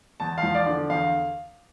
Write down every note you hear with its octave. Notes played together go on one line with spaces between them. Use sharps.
E2 A5
F5
F3
D5
D3
E2 F5